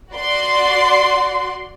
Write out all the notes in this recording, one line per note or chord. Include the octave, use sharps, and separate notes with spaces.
F#4 D5 C6